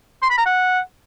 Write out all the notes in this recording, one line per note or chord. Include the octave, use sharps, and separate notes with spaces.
C6
B5
A#5
F#5